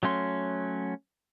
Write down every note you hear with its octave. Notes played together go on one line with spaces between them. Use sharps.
F#3 A3 C#4 C6